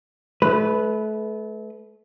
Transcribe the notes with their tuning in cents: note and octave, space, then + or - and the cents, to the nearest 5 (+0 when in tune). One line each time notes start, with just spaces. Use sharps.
A3 -35 B4 +0